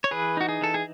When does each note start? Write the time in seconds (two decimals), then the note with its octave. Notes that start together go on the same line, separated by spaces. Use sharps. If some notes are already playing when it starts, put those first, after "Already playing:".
0.04 C#5
0.11 E3 G#4 B4
0.37 D#4 F#4
0.49 G#4
0.61 E3 A4
0.74 G#4